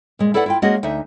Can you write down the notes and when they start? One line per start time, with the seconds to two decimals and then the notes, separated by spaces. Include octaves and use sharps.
0.19 A#2 G#3
0.34 E4 A4 B4 D5 F#5
0.46 E4 F4 G5
0.62 G#3 A#3 C#4 F#4 G#4 D#5
0.83 D2 D#4 E5